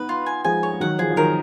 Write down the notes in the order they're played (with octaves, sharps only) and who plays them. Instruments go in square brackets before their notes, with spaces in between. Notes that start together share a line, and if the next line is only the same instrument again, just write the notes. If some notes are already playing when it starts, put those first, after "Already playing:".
Already playing: [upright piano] B3 D#4 [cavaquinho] B4
[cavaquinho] F4
G#5
[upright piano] F3 G#3 [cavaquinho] G#5
[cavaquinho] C#5
[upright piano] G#3
[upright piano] D#3 F#3 [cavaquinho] F#5
[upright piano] F3 [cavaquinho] G#4
[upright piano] F3
[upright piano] D#3 F#3 [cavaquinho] A#4